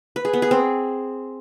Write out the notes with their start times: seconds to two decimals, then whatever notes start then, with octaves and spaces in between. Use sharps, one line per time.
0.16 B4
0.25 G#4
0.33 B3
0.42 G#4
0.51 C4